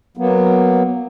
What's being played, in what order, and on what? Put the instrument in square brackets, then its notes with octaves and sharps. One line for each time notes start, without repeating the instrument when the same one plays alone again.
[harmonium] F#3 A#3 B3